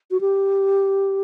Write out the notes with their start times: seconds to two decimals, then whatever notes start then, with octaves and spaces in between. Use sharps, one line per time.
0.11 F#4
0.21 G4